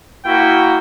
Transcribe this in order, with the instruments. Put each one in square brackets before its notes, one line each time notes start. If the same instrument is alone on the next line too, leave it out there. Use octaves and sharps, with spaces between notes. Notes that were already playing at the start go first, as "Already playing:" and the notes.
[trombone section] A#3 E4 F#4 [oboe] G5